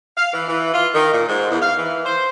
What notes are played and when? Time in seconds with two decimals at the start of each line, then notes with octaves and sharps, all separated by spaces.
0.16 F5
0.32 E3
0.47 E3
0.73 F4
0.93 D#3
1.12 A#2
1.28 G#2
1.50 E2
1.61 F5
1.76 E3
2.05 C5